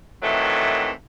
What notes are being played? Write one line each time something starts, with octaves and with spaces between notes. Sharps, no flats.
C3 D#3 E3 F#3 A3